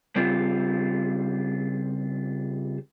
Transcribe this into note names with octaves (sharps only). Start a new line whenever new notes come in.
C#3 G3 C4 F4